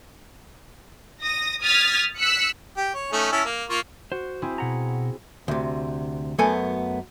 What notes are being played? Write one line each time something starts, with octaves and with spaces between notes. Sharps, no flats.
D#6 A#6
D#6 F6 G#6 A6 B6
E6 F#6 B6 C#7
G4
C#5
A3 C#4 D#4
C#4 E4 A5
A#3
A#3 F4 C#6
F#4 C5
C4 E4 G#4
B2 F#5 A#5
D2 C3
F#2 F#3 A3 B3 A4 G#5